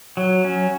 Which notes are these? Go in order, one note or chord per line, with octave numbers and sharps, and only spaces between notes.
F#3
C#4